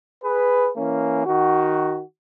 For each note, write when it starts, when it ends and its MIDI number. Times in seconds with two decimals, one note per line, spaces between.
0.23 0.69 68
0.23 0.69 71
0.76 1.23 52
0.76 1.23 58
0.76 1.23 61
1.25 1.99 51
1.25 1.99 66